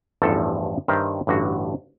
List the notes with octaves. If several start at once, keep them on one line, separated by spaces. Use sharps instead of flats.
A1 E2 G2 F3 A4 A5
G2 D#3 G4 A#4 C5 E5
A1 G2 D3 F#4